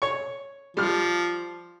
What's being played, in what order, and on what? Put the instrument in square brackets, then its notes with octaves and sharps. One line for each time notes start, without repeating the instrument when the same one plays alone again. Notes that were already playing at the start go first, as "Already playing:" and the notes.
[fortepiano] C#5 C#6
[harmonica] F3 [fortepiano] G3 F6